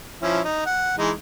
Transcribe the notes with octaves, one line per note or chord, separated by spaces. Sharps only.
F3 C#4 E4
D#4
F#5
E3 G#3 D#4